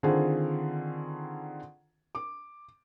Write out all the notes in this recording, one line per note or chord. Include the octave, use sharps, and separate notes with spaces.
D3 D#3 C4 F4 G#4 A4
D6